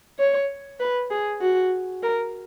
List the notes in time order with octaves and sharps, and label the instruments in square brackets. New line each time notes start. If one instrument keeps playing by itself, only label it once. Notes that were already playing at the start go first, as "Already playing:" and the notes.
[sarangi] C#5
B4
G#4
F#4
A#4